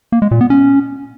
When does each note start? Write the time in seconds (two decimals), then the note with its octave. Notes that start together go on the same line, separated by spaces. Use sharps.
0.12 A#3
0.22 G#3
0.31 A#2
0.41 B3
0.50 C#4